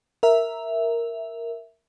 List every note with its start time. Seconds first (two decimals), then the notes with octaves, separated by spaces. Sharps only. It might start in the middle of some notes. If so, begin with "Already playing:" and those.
0.23 A#4 E5